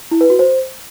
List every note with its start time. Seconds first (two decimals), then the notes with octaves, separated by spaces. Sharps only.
0.11 E4
0.21 B4
0.30 F#4
0.39 C5